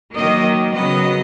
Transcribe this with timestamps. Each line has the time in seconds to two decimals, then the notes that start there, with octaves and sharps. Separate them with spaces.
0.15 D#3 F#3 A#3 D#5
0.74 C#3 F#3 B3 D#5